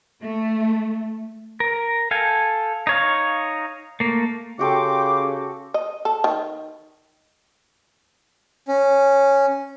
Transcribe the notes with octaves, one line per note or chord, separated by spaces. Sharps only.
A3
A#4
A4 F5 G5 G#5
D#4 C#5 F5
A3 A#3
C#3 F#4 G4 A4 G5 C6 D6
D#5
A4
D#3
C#4